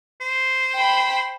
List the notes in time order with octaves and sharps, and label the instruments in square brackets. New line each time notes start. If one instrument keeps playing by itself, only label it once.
[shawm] C5
[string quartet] G5 B5